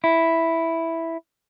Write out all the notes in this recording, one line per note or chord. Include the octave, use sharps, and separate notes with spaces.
E4